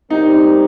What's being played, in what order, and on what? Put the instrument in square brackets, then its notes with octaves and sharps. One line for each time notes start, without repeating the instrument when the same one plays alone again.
[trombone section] G3 C4 G4 A#4 [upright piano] D#4